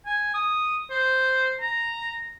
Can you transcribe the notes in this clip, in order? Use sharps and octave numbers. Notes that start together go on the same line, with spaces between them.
G#5
D#6
C5
A#5